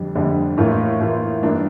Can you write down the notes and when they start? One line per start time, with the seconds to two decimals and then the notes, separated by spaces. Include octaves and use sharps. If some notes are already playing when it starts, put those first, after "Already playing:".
Already playing: F2 D3 G3 D4
0.15 F2 D3 G3 D4
0.58 A2 E3 A#3 F4
1.01 A2 E3 A#3 F4
1.42 G2 E3 A#3 D4